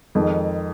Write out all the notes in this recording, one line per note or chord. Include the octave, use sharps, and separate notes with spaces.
F2 D#3 G#3